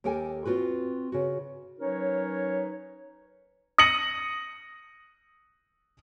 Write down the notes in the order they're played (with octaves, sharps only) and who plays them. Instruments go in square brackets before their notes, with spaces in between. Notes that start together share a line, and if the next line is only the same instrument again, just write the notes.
[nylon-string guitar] D#2 G4 A4 A#4 G5 G#5
C4 F4 F#4 B4
C#3 F#4
[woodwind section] F#3 C#4 D#4 A#4 B4 C#5
[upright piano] D#6 A#6 C#7 F#7